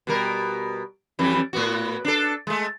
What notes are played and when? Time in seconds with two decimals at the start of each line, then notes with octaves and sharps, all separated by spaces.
0.07 B2 G3 A#4
1.19 F2 E3 G3
1.53 A2 B3 F#4
2.05 D4 A4
2.47 G#3 A3